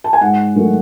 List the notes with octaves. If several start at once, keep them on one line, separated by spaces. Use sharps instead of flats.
A5
G#5
G#2 F#5
D#3 F#3 A3